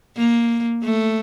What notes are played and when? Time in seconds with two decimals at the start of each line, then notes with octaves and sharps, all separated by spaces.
0.17 A#3
0.84 A3